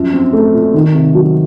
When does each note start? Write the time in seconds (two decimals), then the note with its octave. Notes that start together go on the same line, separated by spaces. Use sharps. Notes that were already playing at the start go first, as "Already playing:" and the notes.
Already playing: F#2 F3
0.13 C4
0.33 A3
0.54 A#2
0.74 D#3
0.94 C3
1.14 F#3